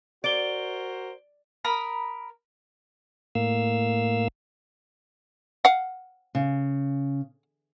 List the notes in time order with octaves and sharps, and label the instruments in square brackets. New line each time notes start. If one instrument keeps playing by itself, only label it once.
[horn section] F#4 A#4 C5 [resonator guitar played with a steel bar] D5 [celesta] D7 G7
[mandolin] A#4 A#5 B5 D#6
[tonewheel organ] A2 A#3 F5 E6
[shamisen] F5 F#5
[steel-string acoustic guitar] C#3